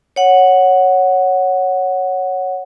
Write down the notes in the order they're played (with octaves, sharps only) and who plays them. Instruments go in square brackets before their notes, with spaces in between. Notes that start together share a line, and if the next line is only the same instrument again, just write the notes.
[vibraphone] C#5 F#5